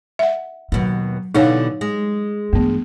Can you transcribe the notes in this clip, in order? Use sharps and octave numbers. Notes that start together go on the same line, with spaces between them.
E5 F#5
D#2 B2 F#3
B2 D3 E3 D#4 C#5 F5
G#3
G2 E3 A3 B3